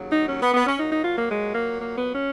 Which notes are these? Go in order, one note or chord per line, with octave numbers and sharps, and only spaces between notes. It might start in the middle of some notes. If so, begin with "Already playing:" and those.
Already playing: D#2 C#3 F#3
D#4
C#4
B3
B3
C#4
A#2 F#3 D#4
D#4
F4
A#3
G#3
A#3
A#3
B3
C#4